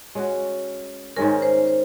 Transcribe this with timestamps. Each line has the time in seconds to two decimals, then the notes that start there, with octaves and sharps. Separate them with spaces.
0.15 G#3 C#4 F#4
1.17 G#2 D#3 G#3 C#4 A#4
1.42 C5
1.67 C5